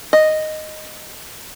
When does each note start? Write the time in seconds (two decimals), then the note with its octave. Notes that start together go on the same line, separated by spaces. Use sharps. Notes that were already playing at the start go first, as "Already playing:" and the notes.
0.13 D#5